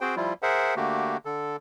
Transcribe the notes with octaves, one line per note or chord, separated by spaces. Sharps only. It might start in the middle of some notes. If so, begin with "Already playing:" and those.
C4 F#4 G#4 C5 G5
F3 G3 E4 F4
G#4 A#4 C5 E5 F#5
D3 A3 A#3 F#4 G4
D3 A4